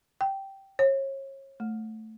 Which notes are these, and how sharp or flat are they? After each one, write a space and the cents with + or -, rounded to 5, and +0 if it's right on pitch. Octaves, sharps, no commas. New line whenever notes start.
G5 -10
C#5 -35
A3 +0